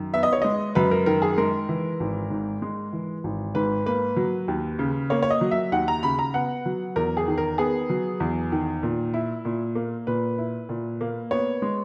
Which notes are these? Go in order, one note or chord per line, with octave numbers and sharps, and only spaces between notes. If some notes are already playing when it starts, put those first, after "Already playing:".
Already playing: F#2 D#3
B3 E5
D#5
C#5
G#3 D#5
F#2 B4
A#4
D#3 A#4
G#4
G#3 A#4
E3
G#1
G#2
G#3
E3
G#1
G#2 B4
A#3 B4
F#3
D#2
C#3
A#3 C#5
C#5
D#5
F#3
E5
D#2 F#5
A#5
C#3 B5
A#5
B3 F#5
F#3
E2 A#4
G#4
D#3
A#4
B3 G#4
F#3
E2
D#3
A#2
E4
A#2
A#3
A#2 B4
E4
A#2
A#3
B3 C#5
G#3